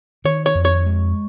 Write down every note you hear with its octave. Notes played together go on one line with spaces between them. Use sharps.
D#3 C#5
C#5
F2
C#5
G#3